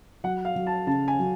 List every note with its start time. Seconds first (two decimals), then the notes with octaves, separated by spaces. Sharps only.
0.24 F#3 F#5
0.45 F5
0.55 F#3
0.67 A5
0.87 C#3 A5
1.08 G#5
1.19 F#3